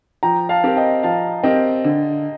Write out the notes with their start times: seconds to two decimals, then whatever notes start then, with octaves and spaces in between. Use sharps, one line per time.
0.23 F3 G5 A#5
0.49 F5 A5
0.64 C4 G4 A#4
0.77 D#5 G5
1.03 F3 F5 A5
1.44 C4 G4 A#4 D#5 G5
1.84 D3